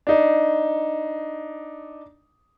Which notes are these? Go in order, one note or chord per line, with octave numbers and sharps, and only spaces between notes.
D4 D#4